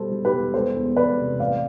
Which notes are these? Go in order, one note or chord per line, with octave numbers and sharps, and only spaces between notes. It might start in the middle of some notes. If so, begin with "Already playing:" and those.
Already playing: B2 G3 A4 C5
G3
G4 B4
E1
E1 A4 C5
E2
E1 B4 D5
C3
A1 D5 F5